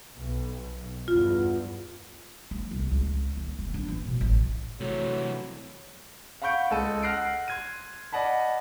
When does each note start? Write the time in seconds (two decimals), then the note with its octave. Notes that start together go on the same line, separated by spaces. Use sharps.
0.17 B1
1.08 E2 G2 F4
2.51 A3
2.71 C2
2.91 C#2
3.37 D#3
3.59 E1
3.74 D4
3.88 E3
4.05 B2
4.21 A1
4.80 C3 E3 F#3 A3
6.42 F5 F#5 B5 C#6 G6 D7
6.71 C#2 A4 D#5 D#7
7.03 F#5 F6 F#6 A#6 C7 D7
7.48 C6 G#6 D#7
8.13 D5 D#5 F#5 A5 B5